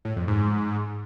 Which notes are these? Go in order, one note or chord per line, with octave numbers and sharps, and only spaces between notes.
A2
F2
G#2